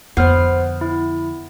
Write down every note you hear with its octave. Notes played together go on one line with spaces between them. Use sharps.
F2 D3 B3 C5 F6 C7
E4